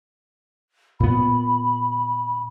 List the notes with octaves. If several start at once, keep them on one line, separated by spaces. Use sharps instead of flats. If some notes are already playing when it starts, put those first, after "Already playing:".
A#2 B3 B5